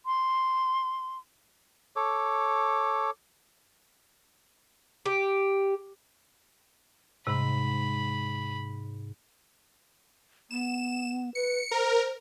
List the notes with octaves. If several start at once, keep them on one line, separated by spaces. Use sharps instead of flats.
C6
A4 C#5 D6
G4
G#2 C3 B5
B3 E7
B4 C#7
A#4 C5